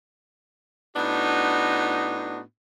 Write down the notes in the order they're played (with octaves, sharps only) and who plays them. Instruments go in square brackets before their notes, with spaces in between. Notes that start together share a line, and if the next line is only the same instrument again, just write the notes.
[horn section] A2 B3 D4 D#4 F#4